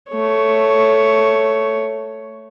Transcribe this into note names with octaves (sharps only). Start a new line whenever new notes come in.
A3 C#5